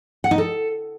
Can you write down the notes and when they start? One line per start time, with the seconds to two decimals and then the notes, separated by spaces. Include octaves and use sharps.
0.24 F#5
0.31 D#4
0.38 A4